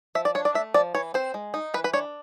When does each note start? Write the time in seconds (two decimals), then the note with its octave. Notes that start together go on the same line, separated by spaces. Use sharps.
0.15 F3 E5
0.25 D5
0.35 D4 C#5
0.45 D5
0.54 A3 E5
0.74 F3 D5
0.95 E3 C#5
1.14 C4 C5
1.34 G#3
1.54 D#4
1.74 E3 B4
1.84 B4
1.93 D4 C#5